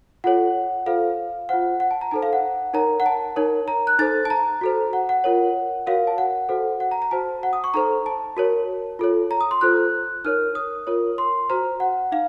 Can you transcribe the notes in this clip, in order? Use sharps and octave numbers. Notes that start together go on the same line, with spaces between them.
F4 A4 C#5 F#5
F4 A4 C5 F5
F4 C5 F#5
F#5
A5
A#5
D#4 A4 C5 A5
F5
F#5
D#4 A#4 C#5 A#5
F#5
A5
D#4 A#4 C#5
A#5
F#6
D#4 A4 C5 A6
A5
A#5
F#4 A4 C5
F#5
F#5
F4 A#4 C#5
F#4 A#4 C#5 F5
A5
F#5
F#4 A4 C5
F#5
A#5
A#5
F#4 C5 A5
F#5
D#6
C#6
D#4 A4 C5 A#5
A5
F#4 A#4 C#5
F4 A4 C#5
A#5
D#6
C6
F4 A4 C5 F#6
D#4 A#4 C#5 F6
D#6
F4 A#4 C#5
C6
F#4 C5 A#5
F#5
D#4 F5